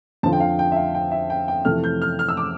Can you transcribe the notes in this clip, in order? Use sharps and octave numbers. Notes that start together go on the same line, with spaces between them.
F2 D3 F3 A5
G5
F5
G5
E5
F5
G5
E5
G5
G5
F2 C3 E3 A3 F6
G6
F6
F6
E6
D6